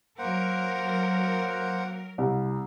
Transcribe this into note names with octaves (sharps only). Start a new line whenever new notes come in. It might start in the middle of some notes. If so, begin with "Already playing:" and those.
F#3 A#3 A#4 C5 F#5
C2